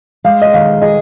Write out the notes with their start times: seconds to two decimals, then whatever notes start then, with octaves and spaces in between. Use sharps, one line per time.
0.24 G#3 F5
0.42 D#5
0.54 D#3 F5
0.82 G#4 D#5